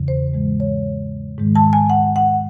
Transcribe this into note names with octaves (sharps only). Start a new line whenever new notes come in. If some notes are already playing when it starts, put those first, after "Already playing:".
Already playing: E2 C#3 E3
C5
G#2 E3 G#3
C#5
G#2 D#3 G#3
A5
G#5
F#5
F#5